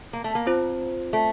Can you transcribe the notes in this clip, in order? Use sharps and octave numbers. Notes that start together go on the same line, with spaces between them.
A#3
A3
A#3
C4 F4 C5
A3